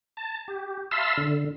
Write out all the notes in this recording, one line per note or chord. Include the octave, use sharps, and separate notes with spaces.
A5
G4
E5 F5 A5 B5 C6 E6
D3